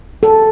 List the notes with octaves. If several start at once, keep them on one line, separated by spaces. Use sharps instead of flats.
A4